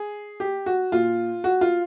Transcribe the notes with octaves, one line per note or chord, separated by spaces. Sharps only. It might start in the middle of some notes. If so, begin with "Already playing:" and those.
Already playing: G#4
G4
F#4
A#2 F4
F#4
F4